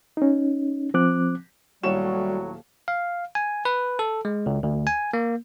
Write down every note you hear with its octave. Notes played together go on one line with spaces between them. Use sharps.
C#4 D#4
F3 C4 D6 F#6
D#1 A2 F#3 G3 F#4 C#5 E7
F5
G#5
B4
A4
G#3
C#2
D2
G#5
A#3